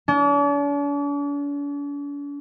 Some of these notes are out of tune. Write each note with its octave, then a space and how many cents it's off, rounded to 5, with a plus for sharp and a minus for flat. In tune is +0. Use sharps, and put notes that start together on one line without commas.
D4 -45